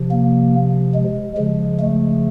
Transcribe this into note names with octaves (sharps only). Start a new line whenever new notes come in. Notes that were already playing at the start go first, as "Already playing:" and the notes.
Already playing: C3 F3
A#3
G#3
C#3 F3 G#3
A3